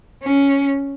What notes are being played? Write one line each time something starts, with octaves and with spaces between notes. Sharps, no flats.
C#4